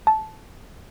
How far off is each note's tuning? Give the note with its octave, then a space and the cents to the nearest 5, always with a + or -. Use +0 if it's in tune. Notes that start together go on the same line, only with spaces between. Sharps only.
A5 -15